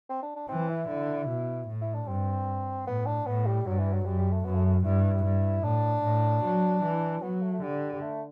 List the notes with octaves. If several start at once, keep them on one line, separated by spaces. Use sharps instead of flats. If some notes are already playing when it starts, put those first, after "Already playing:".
C4
D4
D4
E3 C4
E4
D3
B2
A2
E4
D4
G2 C4
A2 B3
D4
A2 B3
G3
G2 F#3
E3
F#3
F#2 G3
G3
A3
F#2 B3
A3
A3
G2 E4
G2
A2 D4
A2
F#3
E3
F#3 B3
A3
A3
D3 G3
G3
A3